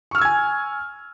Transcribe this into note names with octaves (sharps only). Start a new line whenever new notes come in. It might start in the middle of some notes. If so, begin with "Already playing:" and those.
G#5 C#6 E6 F6 G#6